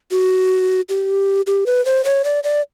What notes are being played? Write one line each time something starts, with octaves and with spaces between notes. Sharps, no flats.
F#4
G4
G4
B4
C5
C#5
D5
D5